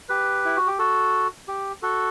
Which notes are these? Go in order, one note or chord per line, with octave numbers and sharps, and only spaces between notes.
G4 B4
E4
F#4
G4
F#4 A4
G4
F#4 A4